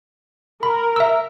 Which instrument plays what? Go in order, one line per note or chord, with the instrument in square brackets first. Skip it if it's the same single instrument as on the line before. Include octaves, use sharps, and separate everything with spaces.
[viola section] A#4 [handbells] B5
[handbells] E5 E6